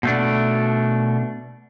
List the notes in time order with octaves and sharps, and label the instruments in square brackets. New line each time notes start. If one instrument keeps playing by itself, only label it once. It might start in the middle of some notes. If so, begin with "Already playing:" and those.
[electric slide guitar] B2 A3 D4